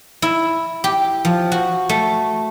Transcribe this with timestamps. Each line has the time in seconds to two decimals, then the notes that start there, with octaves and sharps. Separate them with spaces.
0.22 E4
0.84 G4
1.25 F3
1.52 F#4
1.89 A3